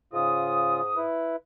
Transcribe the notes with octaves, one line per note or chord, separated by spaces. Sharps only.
G#2 C#3 F4 D#6
E4 B4